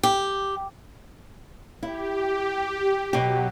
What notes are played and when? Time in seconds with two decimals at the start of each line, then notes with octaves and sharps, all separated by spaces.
0.03 G4
1.83 E4 G4
3.13 B2 F#3 G4